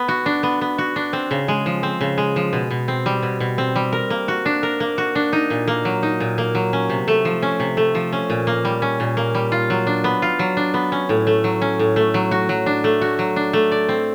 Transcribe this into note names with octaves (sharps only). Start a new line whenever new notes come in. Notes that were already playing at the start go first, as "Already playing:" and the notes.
Already playing: B3
F#4
D4
B3
B3
F#4
D4
C4
C#3
G#3
F3
C4
C#3
G#3
F3
B2
B2
C4
G3
B2
B2
C4
G3
A#4
A#3
F#4
D4
A#4
A#3
F#4
D4
D#4
A#2
A#3
F#3
D#4
A#2
A#3
F#3
C#4
C3
A3
F3
C#4
C3
A3
F3
C#4
A#2
A#3
G3
C#4
A#2
A#3
G3
F4
F#3
D4
B3
F4
F#3
D4
B3
C#4
A2
A3
F#3
C#4
A2
A3
F#3
F#4
F#3
D4
A3
F#4
F#3
D4
A3
D5
C4